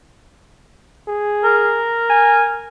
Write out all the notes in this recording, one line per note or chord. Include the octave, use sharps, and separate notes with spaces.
G#4
A#4
G#5